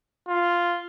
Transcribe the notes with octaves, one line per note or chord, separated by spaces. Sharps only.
F4